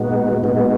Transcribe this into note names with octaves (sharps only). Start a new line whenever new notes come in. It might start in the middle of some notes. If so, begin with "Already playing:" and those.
Already playing: A#2 G#3 B3 D#4 F#4
A#2 G#3 B3 D#4 F#4